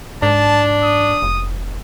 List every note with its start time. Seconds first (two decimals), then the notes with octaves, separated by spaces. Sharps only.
0.23 G#2 D4 A5
0.84 D#6
1.22 F1